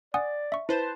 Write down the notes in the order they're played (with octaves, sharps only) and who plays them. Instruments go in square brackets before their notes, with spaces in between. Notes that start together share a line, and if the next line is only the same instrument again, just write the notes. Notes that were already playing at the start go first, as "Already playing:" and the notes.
[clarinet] D5 [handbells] F#5 G#5 D#6
[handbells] E5 C#6
[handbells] E4 [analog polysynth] B4 C5 [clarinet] A5